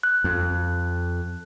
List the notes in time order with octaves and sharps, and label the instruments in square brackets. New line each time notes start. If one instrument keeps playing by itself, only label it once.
[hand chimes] F#6
[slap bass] F2